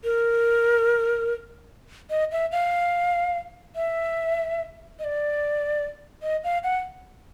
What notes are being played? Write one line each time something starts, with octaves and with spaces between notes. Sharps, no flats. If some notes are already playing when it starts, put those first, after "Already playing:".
A#4
D#5
E5
F5
E5
D#5
D5
D#5
F5
F#5